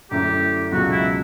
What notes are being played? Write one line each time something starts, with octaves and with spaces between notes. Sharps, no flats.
F#2 D3 A3 E4 G4
C#2 B2 F#3 B3 F#4
E4